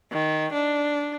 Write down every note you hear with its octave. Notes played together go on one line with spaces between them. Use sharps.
D#3
D4